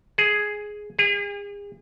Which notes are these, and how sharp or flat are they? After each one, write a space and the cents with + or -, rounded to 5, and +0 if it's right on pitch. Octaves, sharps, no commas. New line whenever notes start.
G#4 +5
G#4 -40